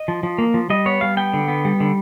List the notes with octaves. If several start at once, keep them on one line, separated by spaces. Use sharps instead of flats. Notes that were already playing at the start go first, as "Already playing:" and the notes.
Already playing: D#5
F3
F3
A#3
F3
G3 D#5
B3 C#5
G3 F5
B3 G5
D3
B3
G3
D3